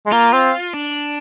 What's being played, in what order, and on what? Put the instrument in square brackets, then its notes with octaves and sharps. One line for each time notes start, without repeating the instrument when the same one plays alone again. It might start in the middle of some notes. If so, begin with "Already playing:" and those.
[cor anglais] G#3
[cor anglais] A#3 [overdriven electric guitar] F4
[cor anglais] C4
[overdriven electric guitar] D4